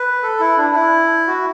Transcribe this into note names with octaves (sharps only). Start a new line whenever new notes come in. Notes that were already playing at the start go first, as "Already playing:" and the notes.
Already playing: B4
A4
E4
D4
E4
F#4